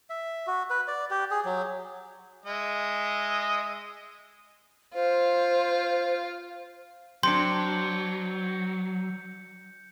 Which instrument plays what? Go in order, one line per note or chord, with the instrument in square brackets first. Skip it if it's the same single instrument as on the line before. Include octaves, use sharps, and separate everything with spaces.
[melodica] E5
F#4
B4
D5
G4
G#4
F#3
[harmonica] G#3 D#5 E5
[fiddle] F4 [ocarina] C5
[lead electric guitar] F#3 [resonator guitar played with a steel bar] C4 D4 [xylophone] C6 [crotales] G6 C#7